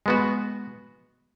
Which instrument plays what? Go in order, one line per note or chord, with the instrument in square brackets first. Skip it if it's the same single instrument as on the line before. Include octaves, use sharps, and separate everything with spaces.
[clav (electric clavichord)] G#3 B3 F#4